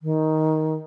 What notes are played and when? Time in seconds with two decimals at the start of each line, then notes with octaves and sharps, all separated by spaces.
0.01 D#3